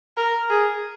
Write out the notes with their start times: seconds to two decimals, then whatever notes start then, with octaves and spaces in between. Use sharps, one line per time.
0.17 A#4
0.50 G#4